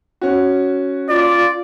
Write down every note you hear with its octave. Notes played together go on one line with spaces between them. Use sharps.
C#4 F#4
F4 D5